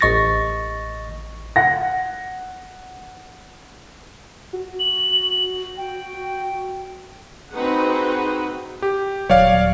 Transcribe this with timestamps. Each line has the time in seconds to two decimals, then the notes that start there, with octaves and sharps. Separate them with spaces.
0.01 A1 D#5 C#6 A6 A#6
1.56 F#5 A#6
4.53 F#4
4.80 F#7
5.77 G5
7.53 C4 D#4 F#4 G#4 B4 F#5
8.82 G4
9.30 D#1 F#3 C#5 D5 F5